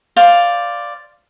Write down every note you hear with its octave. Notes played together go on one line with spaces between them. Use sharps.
C5 D5 F5